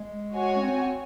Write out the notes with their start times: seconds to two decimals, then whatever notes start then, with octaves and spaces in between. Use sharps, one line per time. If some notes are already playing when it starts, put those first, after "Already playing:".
Already playing: G#3
0.32 F#4 C#5 G#5
0.56 C#4
0.63 C4